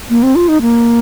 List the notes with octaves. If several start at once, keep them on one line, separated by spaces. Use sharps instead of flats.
A#3
C4
F4
D#4
A#3